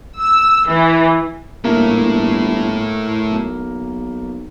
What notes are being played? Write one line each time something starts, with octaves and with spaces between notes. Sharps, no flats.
E6
E3
G1 A3 A#3 E4
B1